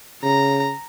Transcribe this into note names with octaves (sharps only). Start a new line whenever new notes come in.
C#3 A#5